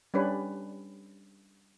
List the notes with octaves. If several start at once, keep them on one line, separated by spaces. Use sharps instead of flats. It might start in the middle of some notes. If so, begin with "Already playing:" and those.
G3 C#4 D4 B4 C#5